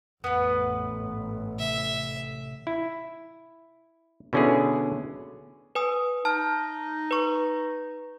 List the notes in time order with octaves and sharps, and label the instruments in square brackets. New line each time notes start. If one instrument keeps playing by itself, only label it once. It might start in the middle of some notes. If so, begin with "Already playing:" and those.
[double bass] A1 [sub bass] F2 [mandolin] B3 B4
[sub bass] G#2
[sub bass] C3 [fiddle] E5
[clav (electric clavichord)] E4
B2 D3 C#4 E4 G#4
[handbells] B4 G#5 D#6
[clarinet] D#4 [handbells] A5 F6
[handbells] B4 C#6